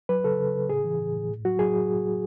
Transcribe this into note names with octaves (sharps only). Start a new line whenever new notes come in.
F#3 B4
C#3 A4
C#3
C#3
A2 G#4
E3
A2
A2
A2
F#3 F#4
F#3 G#4